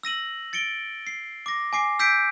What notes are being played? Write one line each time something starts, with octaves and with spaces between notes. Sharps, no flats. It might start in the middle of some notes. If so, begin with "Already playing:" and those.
E6 A#6 D#7 F#7
A6 C#7 D7 G7
C7
D6 A#6
G#5 D6 C7
E6 G6 B6 C7 D7